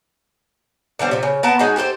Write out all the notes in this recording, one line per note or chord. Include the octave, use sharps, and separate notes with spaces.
D3 E3 G3 C4
C3 F3
C#3
B3 A#4 A5
G#3 D#4 F#4 G#4
G4 A4 A#4 C5